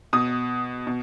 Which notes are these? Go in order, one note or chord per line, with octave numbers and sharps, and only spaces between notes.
B2 D#6
B2